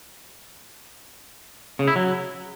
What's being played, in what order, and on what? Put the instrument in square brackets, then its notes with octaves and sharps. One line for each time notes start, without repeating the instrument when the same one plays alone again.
[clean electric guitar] C#3
E4
F#3